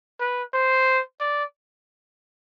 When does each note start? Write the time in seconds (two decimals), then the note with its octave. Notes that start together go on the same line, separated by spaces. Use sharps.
0.20 B4
0.54 C5
1.20 D5